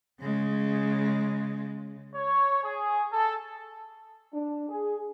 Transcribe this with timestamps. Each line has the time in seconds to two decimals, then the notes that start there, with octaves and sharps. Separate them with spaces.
0.21 C#3 G#3
2.15 C#5
2.64 G#4
3.13 A4
4.34 D4
4.69 G#4